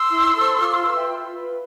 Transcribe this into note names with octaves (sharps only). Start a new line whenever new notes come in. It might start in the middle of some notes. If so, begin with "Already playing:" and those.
Already playing: C6 E6
E4
A4 C5
F4 D6 F6
C6 E6
B4 C6 E6
E5 G5
F4
B4